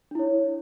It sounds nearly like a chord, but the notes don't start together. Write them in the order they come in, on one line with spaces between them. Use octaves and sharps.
D4 E4 C#5